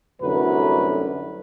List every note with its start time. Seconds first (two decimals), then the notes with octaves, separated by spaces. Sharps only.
0.22 C2 F#2 D3 F#3 A3 B4